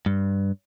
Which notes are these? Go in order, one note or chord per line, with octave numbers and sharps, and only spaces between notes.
G2